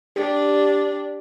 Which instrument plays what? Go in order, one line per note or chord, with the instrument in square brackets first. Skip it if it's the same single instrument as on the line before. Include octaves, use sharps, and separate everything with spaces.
[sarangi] D4 [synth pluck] G4